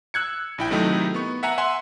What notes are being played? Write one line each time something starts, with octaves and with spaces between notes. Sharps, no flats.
E6 F#6 G#6 C#7
A#1 E4 G5
C3 D#3 F#3 A3 D#4 E4
B3 C#6
E5 F#5 G#5 A#5
E5 F#5 G#5 C6